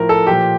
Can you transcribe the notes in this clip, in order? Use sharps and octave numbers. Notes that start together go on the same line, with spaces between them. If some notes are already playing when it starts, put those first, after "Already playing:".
Already playing: A2 F3 A#4
A4
A#2 F3 G4